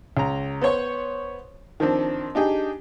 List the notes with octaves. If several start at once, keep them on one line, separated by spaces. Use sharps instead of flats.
C#2 A#5
B3 C5 C#5 C#6
D#3 F3 C4 D4
D4 D#4 G4 G#4